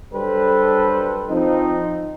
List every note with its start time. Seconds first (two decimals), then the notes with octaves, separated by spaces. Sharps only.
0.14 F#3 G3 D4 A4 B4 C5
1.29 F3 C4 D#4